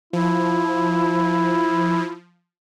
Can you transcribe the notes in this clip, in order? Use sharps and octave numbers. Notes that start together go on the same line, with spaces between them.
F3 E4